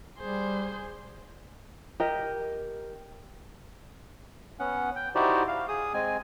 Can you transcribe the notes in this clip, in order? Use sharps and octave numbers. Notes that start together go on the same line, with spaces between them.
G3 G#4 C5
G4 A#4 D#5
B3 C#4 F#5
G5
D#4 E4 F#4 G4 C5 D5
F5
G#4 D#6
G#3 C4 G#5